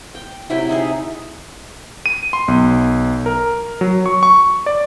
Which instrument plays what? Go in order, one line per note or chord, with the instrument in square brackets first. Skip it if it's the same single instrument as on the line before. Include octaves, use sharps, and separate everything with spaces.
[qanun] G5
C3 F#3 E4 G5
D#4 E4 G#4
[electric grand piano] D#7
C6
B1
A#4
F#3
C#6
C#6
D5